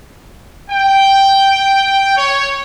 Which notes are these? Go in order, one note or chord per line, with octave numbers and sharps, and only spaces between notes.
G5
C#5